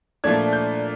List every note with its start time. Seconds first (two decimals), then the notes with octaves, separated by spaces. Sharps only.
0.24 A#2 F3 A3 D4 G#6
0.53 G6